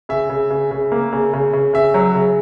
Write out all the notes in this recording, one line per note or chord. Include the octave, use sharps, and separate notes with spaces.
C#3 E5
C#3
C#3
C#3
A#3
C#3
C#3
C#3
C#3 E5
F#3
C#3